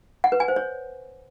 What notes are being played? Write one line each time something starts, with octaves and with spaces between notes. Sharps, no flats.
F#5
B4
G#5
C5
C#5